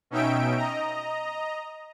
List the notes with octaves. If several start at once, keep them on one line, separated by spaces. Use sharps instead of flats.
B2 C#4 D#4 E5 G5 D7
D#5 A#5